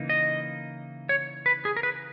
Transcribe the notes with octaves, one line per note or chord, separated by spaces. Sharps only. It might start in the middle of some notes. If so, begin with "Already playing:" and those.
Already playing: C#3 E3 A#3 D#4
D#5
C#5
B4
G#4
A#4
B4